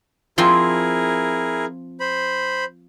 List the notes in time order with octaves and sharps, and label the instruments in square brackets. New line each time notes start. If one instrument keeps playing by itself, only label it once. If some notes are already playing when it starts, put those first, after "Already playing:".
[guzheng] F3 C4 F4 [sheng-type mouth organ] E4 G#4 A#4
[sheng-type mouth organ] C5 B5